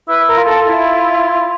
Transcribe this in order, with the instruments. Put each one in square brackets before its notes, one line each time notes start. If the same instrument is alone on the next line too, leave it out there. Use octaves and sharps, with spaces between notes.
[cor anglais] E4 [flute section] B4
[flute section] A#4
[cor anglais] F4
[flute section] A4
E4